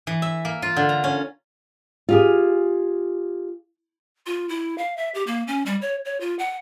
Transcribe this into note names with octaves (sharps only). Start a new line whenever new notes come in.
E3
E5
A#3
F4
D3
A#5
C#4
F4 G4 G#4
F4
E4
F5
E5
G4
A#3
C#4
G3
C#5
C#5
F4
F#5